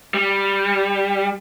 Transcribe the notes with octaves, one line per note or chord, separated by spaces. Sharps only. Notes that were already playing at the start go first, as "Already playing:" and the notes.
G3